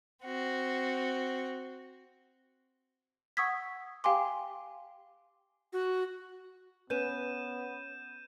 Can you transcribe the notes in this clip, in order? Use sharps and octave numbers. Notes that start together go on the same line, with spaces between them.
C4 F#4
F#5 C#6 D#6 E6 G#6 B6
G4 F5 G5 G#5 C6 D6
F#4
B3 C#4 B4 G6 D#7 E7